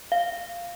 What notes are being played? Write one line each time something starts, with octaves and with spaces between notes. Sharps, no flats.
F5